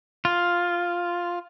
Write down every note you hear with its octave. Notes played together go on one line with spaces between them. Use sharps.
F4